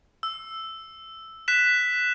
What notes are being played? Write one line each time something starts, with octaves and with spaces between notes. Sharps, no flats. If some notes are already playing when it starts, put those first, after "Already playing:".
E6
F#6 B6 E7